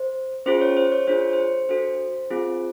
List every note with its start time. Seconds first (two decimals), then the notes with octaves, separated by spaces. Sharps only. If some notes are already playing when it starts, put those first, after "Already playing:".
Already playing: C5
0.46 C#4 F4 G#4 C5
0.62 C#5
0.77 C5
0.92 C#5
1.07 D4 F4 G#4 C5
1.21 C#5
1.33 C5
1.69 D4 F#4 A4 C5
2.30 C4 F4 G#4